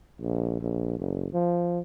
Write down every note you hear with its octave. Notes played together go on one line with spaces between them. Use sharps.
A#1
A#1
F#1
F3